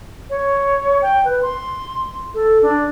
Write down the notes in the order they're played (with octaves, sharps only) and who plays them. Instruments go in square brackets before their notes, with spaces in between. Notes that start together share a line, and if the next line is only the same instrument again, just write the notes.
[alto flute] C#5
G5
B4
C6
A4
D4